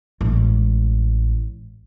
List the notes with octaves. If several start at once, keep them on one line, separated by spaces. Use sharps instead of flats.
A1 G#3